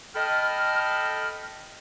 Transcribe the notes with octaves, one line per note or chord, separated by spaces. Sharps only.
A4 D#5 G5 A5 B5 F6